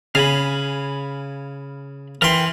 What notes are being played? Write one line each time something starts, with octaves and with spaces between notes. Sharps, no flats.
C#3 F5 G#5 B5
E3 A#4 G5 C6